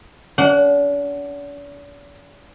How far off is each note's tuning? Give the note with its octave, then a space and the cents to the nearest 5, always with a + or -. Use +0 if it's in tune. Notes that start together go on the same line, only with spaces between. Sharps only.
D4 -45 F#5 +5